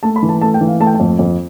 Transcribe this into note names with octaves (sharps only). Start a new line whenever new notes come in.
A3 A5
B5
E3
A5
A3 A5
G5
E3
F5
A3 A5
G5
A5
F2
F2